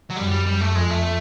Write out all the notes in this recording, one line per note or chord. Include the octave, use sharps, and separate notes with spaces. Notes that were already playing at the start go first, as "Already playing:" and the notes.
F#3
F#2 G3
G3
F#2 G3
A3
F2 G#3
A3